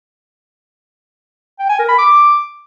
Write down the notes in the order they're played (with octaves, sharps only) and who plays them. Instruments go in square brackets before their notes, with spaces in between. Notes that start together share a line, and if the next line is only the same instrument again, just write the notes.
[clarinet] G5
G#5
A#4
B5
D6